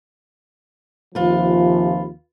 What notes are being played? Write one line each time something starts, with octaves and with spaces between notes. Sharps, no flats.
D#2 C3 F3 F4 B4